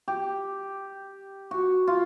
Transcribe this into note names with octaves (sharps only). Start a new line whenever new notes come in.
G4
F#4
F4